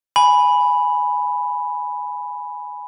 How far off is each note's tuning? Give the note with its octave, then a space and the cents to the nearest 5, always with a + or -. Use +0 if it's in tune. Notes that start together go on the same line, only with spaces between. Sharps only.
G#5 +0 B5 +0